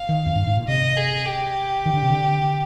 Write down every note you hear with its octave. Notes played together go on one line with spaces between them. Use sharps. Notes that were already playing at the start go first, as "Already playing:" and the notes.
Already playing: F5
D#3
F2
G2
G#2
A#2
C3 D#5
G#4
G4
D#3
D3
C3
D3